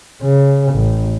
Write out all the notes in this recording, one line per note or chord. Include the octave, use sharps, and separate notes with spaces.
C#3
A1